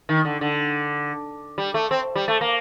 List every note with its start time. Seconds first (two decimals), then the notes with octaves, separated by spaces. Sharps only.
0.09 D#3
0.25 D3
0.41 D3
1.58 G3
1.74 A3
1.91 C4
2.15 G3
2.28 A3
2.41 A#3